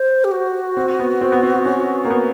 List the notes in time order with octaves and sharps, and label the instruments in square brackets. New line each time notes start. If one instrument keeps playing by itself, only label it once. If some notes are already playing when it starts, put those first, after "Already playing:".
Already playing: [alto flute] C5
G4
F#4
[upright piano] C4
B3
C4
B3
C4
C#4
A#3
B3